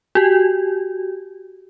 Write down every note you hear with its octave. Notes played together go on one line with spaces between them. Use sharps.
F#4 G4